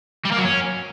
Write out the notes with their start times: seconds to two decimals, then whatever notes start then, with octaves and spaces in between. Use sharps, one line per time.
0.25 G3
0.31 A#3
0.38 F#3
0.44 C#4